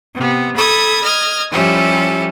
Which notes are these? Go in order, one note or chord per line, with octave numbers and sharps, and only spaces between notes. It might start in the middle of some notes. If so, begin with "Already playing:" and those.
C3 B3
A4 B5 D#6 G#6
D#5 F6 G#6
F3 G3 C#4 E4 G4 A4